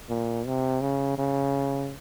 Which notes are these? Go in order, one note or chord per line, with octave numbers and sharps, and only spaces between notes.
A#2
C3
C#3
C#3